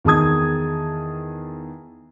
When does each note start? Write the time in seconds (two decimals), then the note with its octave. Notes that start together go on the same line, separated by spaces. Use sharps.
0.05 E2 D#3 G#4 A5 D#6 G#6